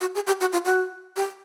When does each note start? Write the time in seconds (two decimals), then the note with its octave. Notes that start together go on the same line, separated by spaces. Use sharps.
0.01 F#4
0.15 G#4
0.27 G4
0.41 F#4
0.52 F4
0.65 F#4
1.16 G4